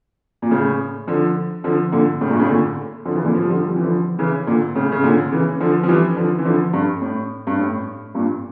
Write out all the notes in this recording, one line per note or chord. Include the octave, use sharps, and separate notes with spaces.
A#2
A2 C#3
D3 F3
D3 F3
A#2 D3
A2 C#3
G2 A#2
A2 C#3
A#2 D3
D3 F3
C#3 E3
A#2 D3
F3
G3
D3 F3
G3
F3
E3
D3 F3
C#3 E3
A#2 D3
A2 C#3
C#3
A#2 D3
C#3 E3
D3 F3
F3
E3 G3
D3 F3
E3
D3 F3
G2
A2
G2
A2
G2 A#2